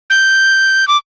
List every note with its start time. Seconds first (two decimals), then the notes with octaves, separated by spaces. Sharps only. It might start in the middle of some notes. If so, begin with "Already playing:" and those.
0.10 G6
0.88 D6